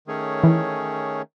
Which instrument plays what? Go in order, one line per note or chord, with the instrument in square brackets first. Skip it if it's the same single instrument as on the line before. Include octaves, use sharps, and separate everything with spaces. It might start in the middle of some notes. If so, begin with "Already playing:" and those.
[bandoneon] D#3 A3 C#4 G#4 C#5
[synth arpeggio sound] E3